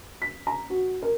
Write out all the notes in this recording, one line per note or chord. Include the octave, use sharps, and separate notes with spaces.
B6
A#5
F#4
A#4